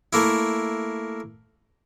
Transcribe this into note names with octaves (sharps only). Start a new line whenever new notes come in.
A3 A#3 E4